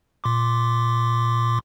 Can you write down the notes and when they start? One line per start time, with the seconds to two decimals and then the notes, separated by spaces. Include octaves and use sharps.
0.24 A#2 C6 D6